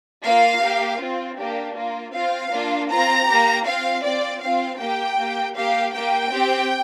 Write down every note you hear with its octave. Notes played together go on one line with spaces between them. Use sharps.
A#3 F4 F5
A#3 G4
C4 F4
A#3 D4 G4
A#3 F4
C4 F4 F5
A#3 D4 F4
C4 F4 A#5
A#3 G4
C4 F4 F5
C4 F4 D5
C4 F4 F5
A#3 G4 G5
A#3 G4
A#3 G4 F5
A#3 G4 G5
C4 G4